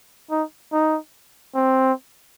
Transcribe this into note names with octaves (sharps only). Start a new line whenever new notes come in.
D#4
D#4
C4